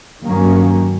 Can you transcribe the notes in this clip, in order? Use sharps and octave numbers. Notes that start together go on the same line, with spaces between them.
G2 D#3 F#3 A#3 C#4